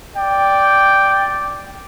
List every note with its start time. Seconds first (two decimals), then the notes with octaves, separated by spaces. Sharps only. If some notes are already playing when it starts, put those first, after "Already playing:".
0.16 D5 G5